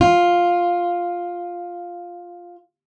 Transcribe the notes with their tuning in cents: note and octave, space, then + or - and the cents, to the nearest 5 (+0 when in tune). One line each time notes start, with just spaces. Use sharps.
F4 +5